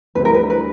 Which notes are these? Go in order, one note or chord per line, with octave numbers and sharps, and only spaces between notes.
D2 D3 G3 C4 E4 B4
A#4
B4
B4